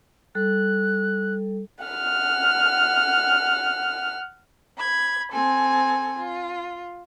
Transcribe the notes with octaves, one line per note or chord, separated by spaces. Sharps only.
G3 A4 F#6
F#5 F6
B5 G#6
C4 A4 G#5
F4